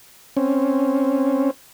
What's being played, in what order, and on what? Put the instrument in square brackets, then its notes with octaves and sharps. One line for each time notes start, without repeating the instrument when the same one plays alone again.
[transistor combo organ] C4 C#4